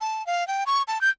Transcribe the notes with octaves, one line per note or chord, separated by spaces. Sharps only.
A5
F5
G5
C#6
A5
G6